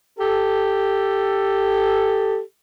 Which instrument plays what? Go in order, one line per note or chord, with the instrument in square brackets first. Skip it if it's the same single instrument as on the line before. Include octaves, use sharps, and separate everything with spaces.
[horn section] G4 A4